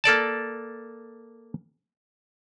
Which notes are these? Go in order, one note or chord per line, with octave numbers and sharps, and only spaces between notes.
A#3 A4 D5 A5